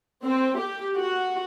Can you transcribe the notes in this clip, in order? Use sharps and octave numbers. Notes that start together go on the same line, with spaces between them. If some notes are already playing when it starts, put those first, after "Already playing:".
C4
G4
F#4